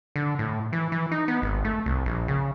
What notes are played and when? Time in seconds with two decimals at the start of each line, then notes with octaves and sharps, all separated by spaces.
0.16 D3
0.39 A2
0.73 E3
0.92 E3
1.11 D#4
1.28 B3
1.42 G#1
1.65 A3
1.86 C2
2.06 A#1
2.28 C#3